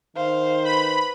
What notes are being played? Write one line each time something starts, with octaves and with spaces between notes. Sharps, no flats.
D#3 C5 F5
B4 B5